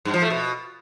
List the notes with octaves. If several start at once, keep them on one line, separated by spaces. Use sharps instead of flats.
G2
F3
A3
B2